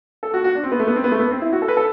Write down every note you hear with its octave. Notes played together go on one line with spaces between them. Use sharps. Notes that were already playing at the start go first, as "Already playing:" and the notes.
A4
F#4
F#4
D4
C4
B3
A3
B3
C4
B3
A3
B3
C4
E4
F#4
A4
B4
A4